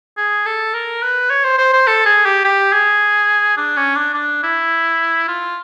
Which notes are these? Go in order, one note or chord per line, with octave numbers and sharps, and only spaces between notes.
G#4
A4
A#4
B4
C#5
C5
C5
C5
A4
G#4
G4
G4
G#4
D4
C#4
D4
D4
E4
F4